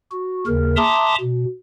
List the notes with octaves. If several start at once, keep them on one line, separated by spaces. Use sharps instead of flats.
F#4
D#2 C#3 A#4
E5 A5 A#5 C6 D6 D#6
B2